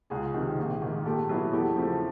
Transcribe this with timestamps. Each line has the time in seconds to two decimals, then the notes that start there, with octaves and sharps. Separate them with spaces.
0.10 C#2 G#4
0.34 C3 D#3
0.58 A#1
0.82 G#2 D#3
1.05 A#2 G4 A4
1.29 F#3 B3 E4 G#4
1.52 E2 G4 A4
1.76 C#3 F3 A3 C4